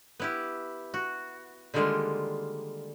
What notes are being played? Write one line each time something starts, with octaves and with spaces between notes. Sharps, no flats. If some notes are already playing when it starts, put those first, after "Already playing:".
B3 E4 G4
F#4
D3 D#3 G3 G#3 A#3 F4